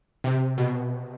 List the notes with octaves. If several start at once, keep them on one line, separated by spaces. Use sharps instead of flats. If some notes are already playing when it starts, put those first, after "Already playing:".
C3
B2